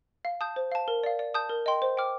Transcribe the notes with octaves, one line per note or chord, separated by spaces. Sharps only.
F5
A5 D#6 G6
C5
F5 A5
A#4
D5 F5
D5
A5 D#6 G6
A#4
D#5 G5 C6
C5
G5 D6 F6